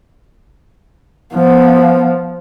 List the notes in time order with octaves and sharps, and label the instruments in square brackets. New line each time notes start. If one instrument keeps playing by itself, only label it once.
[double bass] F3 [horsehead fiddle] B3